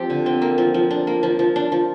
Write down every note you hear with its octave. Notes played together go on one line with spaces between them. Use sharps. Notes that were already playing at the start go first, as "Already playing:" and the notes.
Already playing: F3 C4 G4
D3
C4
A#3
F3
F3
D4
A#3
F3
F3
D4
F3